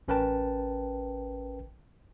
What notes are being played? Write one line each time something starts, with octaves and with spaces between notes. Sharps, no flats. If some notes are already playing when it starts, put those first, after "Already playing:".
A1 C#4 A#4 B4 G5 A5